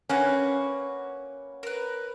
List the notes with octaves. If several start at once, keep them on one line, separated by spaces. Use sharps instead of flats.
A#3 C#4 F#4 B4
A#4 B4